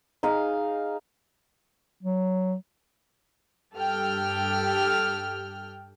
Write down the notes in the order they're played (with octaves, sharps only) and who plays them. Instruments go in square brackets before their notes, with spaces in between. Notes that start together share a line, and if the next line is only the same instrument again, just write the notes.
[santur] D#4 G#4 F5
[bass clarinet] F#3
[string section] G2 G4 A4 G5 F6